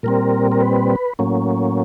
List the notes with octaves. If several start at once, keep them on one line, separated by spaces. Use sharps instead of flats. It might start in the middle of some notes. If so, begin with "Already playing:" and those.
A#2 G3 C4 A#4
A#4
B4
A2 F#3 A#3 C#4